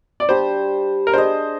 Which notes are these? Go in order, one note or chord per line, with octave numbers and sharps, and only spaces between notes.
D5
G3 D4 G4 C5
A#4
D4 G#4 C5 D#5